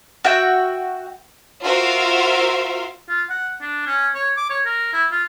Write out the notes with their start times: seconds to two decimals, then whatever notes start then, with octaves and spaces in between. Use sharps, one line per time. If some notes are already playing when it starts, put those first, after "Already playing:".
0.25 F#4 E5 G5
1.62 F4 F#4 A#4 C5 E5 F5
3.09 F4
3.30 F#5
3.61 D4
3.87 C#4
4.15 C#5
4.37 D6
4.50 C#5
4.66 A#4
4.93 E4
5.12 F4